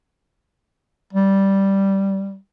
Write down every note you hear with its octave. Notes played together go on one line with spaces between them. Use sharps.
G3